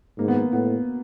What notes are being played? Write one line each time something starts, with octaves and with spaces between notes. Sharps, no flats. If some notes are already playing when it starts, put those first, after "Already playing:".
G#2 A#3
B3
A#3
A2 B3